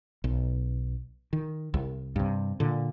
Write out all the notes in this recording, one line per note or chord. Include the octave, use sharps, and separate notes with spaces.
B1
D#3
C2
G2 C3
A#2 D3